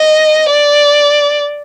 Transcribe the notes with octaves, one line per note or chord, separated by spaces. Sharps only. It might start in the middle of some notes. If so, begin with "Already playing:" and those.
Already playing: D#5
D5